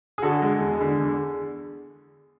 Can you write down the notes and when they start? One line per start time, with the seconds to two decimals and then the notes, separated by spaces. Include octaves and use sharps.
0.18 G#4
0.22 D3 F#4 A4
0.42 G#3
0.61 E2
0.80 D3
1.00 E2